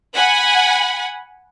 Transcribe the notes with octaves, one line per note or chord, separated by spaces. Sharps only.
F#5 G#5 B5